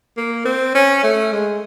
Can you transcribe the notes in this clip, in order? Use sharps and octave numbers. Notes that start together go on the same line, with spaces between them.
A#3
C4
C#4
A3
G#3